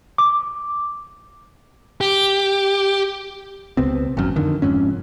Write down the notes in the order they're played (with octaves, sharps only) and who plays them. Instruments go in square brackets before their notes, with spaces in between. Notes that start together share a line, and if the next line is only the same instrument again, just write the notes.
[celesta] D6
[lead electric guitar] G4
[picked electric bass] C#2 C3 B3 C4
G#1 F#2
F2 D3 D#3
F1 F2 G#2 C#4